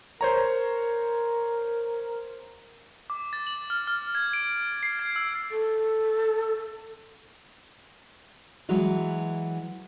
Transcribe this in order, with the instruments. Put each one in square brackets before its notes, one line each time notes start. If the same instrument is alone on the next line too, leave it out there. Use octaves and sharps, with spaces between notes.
[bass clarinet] A#4 [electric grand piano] C5 C#5 A#5
[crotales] D6
A6
F#7
F6
F6
G#6
D7
C7
G#6
E6
[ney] A4
[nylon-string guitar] E3 F#3 G#3